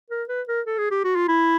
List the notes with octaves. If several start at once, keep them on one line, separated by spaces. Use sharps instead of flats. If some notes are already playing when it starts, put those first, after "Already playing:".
A#4
B4
A#4
A4
G#4
G4
F#4
F4
E4